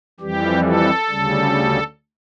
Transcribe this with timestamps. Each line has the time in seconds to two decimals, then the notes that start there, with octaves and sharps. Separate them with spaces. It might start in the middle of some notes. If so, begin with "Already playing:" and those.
0.20 F2 E3 G3 G4
0.65 A4
1.09 D2 C#3 G3